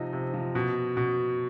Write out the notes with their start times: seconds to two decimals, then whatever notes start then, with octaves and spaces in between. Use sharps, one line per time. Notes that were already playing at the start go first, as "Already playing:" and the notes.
Already playing: C3 F3 D#4
0.13 C3
0.34 F3
0.55 B2
0.97 B2